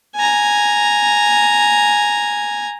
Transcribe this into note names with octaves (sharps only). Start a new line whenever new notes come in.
G#5 A#5